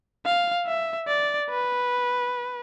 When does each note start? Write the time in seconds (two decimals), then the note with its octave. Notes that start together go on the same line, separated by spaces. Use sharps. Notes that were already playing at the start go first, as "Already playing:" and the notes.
0.26 F5
0.67 E5
1.08 D5
1.50 B4